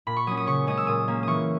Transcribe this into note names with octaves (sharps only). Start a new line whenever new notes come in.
A#2 B5
C#6
F#3 C#4 D#6
D#6
C#3 C#6
G#3 C#4 D#6
E6
A#2 D#6
A#3 C#4
E3 C#6 D#6